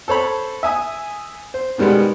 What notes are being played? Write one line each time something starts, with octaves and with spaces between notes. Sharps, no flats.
A4 C5 C#5 B5
E5 G#5 D#6
C5
B2 D#3 G3 G#3 B3